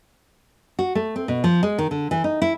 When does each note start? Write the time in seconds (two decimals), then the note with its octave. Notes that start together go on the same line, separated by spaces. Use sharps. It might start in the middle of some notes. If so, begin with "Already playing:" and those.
0.79 F#4
0.95 A3
1.16 C4
1.28 B2
1.44 F3
1.63 G#3
1.78 D#3
1.91 D3
2.11 E3
2.24 D#4
2.42 E4